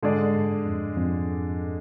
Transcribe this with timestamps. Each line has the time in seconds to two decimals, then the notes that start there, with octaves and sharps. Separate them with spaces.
0.03 G#2 D3 G#3 D4 G#4 D5
0.35 G2
0.66 F2
0.97 F2